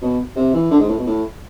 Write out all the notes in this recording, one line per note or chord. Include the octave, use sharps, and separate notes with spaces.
B2
C3
E3
D3
G#2
A2
B2
A2